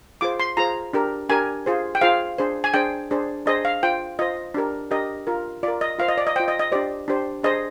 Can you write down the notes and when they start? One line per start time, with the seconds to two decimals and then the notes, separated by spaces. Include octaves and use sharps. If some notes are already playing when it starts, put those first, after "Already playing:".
0.21 F4 G#4 C5 D6
0.40 C6
0.57 F4 G#4 C5 A#5
0.93 D4 G4 A#4
1.29 D4 G4 A#4 G#5
1.66 F4 G#4 C5
1.95 G5
2.01 F4 G#4 C5 F5
2.38 D4 G#4 C5
2.64 G#5
2.74 D4 G#4 C5 G5
3.11 D4 G#4 C5
3.46 D4 G#4 C5 D#5
3.65 F5
3.83 F4 C5 G5
4.19 F4 C5 D#5
4.54 D4 G4 A#4
4.91 D4 G4 A#4 D#5
5.27 F4 A#4
5.63 F4 D5
5.68 A#4
5.81 D#5
5.99 F4 C5 F5
6.08 D#5
6.18 D5
6.27 D#5
6.36 F4 C5 G5
6.48 D#5
6.59 D#5
6.72 D4 G4 C5 D5
7.08 D4 G4 C5
7.43 D4 G#4 C5 D#5